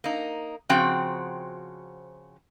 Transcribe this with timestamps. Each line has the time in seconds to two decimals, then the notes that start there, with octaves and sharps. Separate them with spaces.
0.04 A#3 D#4
0.69 C#3 F3 C4 F#4 G5